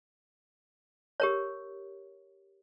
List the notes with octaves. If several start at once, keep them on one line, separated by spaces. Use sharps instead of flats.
G4 A#4 C#5